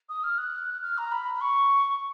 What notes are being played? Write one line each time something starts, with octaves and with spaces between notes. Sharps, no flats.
D#6
F6
F#6
F6
A#5
B5
B5
C#6